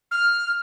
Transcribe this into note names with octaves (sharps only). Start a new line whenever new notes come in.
F6